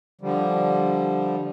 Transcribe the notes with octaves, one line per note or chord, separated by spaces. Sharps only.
D3 F3 G3